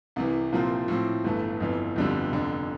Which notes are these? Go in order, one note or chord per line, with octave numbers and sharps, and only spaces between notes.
C2 C3 E3
C2 A#2 F3 C4
A2 F3 C4
G1 G2 E3 A3
G1 F2 E3
G1 F2 D3 G3
F1 F2 D3